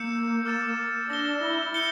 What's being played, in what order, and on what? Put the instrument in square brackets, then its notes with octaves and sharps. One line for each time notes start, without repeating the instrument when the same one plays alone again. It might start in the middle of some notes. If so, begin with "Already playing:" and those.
Already playing: [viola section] A#3 [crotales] E6 G6 C#7 E7
[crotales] D6 F6 A6 E7
[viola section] D4 [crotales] E6 A#6 E7 G7
[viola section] E4
[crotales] G6 C#7 G7